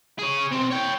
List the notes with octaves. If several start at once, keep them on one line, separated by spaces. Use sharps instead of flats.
G#4 C#5
B1 C4
C#5 G5